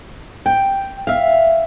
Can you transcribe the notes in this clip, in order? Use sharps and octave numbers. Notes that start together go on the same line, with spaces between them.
G5
E5 F5